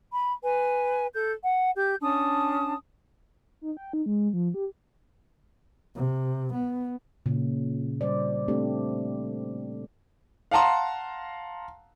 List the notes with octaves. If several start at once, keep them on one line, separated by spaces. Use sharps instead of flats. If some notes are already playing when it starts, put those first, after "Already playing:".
B5
B4 G#5
A4 G6
F#5
G4 G6
C#4 D4 A5 D#6
D#4
G5
D#4
G#3
F3
G4
C3
B3
A#2 C#3
G3 C5 D5
A3 C4 D4 G4
F5 F#5 A5 A#5 C6